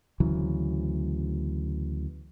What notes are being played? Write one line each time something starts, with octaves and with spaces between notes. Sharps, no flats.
D2 C#3 E3 F#3